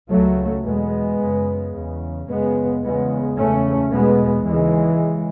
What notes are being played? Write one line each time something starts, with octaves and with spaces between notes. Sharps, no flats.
C#2 C#3 F#3 A3
E2 B2 G#3 B3
F#2 C#3
E2 C#3
F#2 C#3 G#3 B3
E2 C#3 G#3 B3
E2 C#3 A3 C#4
E2 B2 G#3 B3
D#2 C#3 E3 G#3
C#3